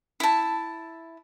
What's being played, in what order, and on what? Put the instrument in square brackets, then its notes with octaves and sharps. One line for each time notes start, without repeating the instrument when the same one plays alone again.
[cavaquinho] E4 A5